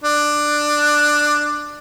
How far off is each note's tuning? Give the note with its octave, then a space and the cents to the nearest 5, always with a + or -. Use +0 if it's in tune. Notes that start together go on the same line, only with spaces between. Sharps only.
D4 +10